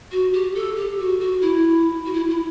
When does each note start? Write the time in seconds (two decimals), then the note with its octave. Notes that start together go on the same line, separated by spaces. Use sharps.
0.12 F#4
0.33 G4
0.55 A4
0.76 G4
0.99 F#4
1.20 F#4
1.41 E4
2.05 F#4
2.13 E4
2.30 E4